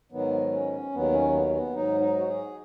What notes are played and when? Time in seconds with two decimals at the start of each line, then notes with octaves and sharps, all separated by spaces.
0.11 G#2 D#3 F#3 B3
0.53 C#4
0.92 D#2 D#3 F#3 B3
1.12 C#4
1.33 B3
1.53 B3
1.74 G#2 F#3 D#4
2.00 D#4
2.19 F#4
2.28 G#4